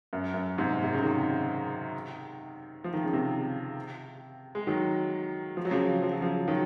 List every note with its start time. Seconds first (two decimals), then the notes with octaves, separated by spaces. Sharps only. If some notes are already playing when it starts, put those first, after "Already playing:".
0.13 F#2
0.34 F#2
0.58 G#2 C3
0.83 C3
0.93 C#3
1.03 C3 D#3
2.84 F3
2.93 D#3
3.04 C#3
3.13 C3 D#3
4.55 G#3
4.67 D#3 F#3
5.57 F3
5.65 F#3
5.71 C#3 F3
6.02 F3
6.12 F#3
6.21 C#3 F3
6.48 D#3 F#3